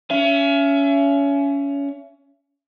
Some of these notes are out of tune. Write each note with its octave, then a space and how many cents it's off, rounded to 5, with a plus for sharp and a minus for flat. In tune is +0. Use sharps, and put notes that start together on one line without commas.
C#4 +25 E5 +35